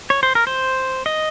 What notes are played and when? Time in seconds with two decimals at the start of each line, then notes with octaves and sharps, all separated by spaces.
0.10 C#5
0.23 C5
0.35 A#4
0.47 C5
1.06 D#5